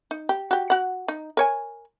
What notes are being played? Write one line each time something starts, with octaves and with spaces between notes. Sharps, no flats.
D#4
G4
F#4 G4
F#4 F#5
D#4
A#4 C#5 G#5